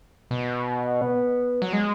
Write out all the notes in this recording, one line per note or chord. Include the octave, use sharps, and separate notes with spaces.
B2
B3
F#3
G#3